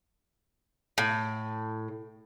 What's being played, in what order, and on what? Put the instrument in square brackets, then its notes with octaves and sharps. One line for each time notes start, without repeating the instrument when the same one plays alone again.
[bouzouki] A2